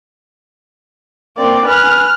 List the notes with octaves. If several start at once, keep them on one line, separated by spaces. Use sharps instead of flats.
A#3 C4 D5
B4 G#5 F6 F#6